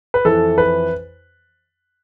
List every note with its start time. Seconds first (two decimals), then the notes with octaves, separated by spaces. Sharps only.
0.14 B4
0.25 F2 E3 A4
0.58 B4